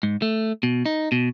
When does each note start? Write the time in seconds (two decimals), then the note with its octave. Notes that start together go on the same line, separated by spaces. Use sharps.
0.03 G#2
0.22 A3
0.63 B2
0.86 D#4
1.12 B2